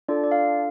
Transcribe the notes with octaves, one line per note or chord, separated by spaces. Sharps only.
D4 F4 A4 D5
D5
F5